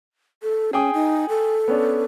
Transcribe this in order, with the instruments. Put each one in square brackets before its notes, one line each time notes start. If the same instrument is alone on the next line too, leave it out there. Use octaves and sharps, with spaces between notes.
[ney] A4
[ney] C#4 [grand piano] G#4 G5 D#6
[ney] D#4
A4
[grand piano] B3 C#4 D4